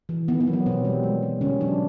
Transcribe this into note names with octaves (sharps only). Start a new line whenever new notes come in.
E3
D#3 B3
B3
F#3
B3
B2 C4
G3
G#3
G#3
D3 C#4
F#3 D4